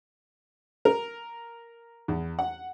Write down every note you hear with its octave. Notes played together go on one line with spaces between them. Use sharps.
A#4
E2
F#5